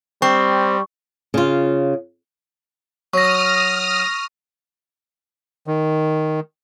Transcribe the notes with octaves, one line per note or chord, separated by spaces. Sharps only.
G3 C4 C#6
C#3 F4
F#3 C#6 D#6 F6 A#6
D#3